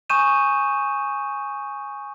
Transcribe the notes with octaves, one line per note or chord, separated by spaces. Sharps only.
G#5 C#6 D#6 G6 D#7 E7